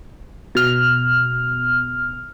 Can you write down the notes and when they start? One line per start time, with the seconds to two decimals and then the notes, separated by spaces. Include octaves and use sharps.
0.55 B2 F6